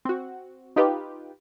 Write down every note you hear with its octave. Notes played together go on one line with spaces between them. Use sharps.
C4 F#4
D#4 F4 G4 B4